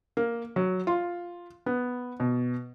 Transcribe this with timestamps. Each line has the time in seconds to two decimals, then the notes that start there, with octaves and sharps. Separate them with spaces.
0.17 A#3
0.56 F#3
0.87 F4
1.66 B3
2.20 B2